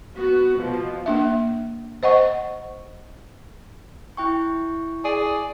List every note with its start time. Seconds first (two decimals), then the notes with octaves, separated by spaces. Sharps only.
0.16 B3 F#4
0.58 B2 F3
1.06 A#3 D4 E5
2.03 C5 D#5 F#5 C#6
4.17 E4 G5 C#6
5.04 G#4 D5